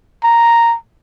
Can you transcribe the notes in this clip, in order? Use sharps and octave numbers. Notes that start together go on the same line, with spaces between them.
A#5